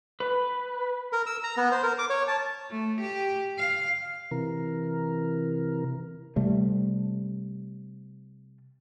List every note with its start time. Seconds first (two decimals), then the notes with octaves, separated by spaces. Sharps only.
0.20 B4
1.13 A#4
1.26 E6
1.43 A#5
1.57 B3
1.71 C5
1.83 A#4
1.99 D6
2.10 C#5
2.28 A5
2.71 A3
3.01 G4
3.58 F5
4.31 C3 E3 A#4
6.36 C3 G3 A3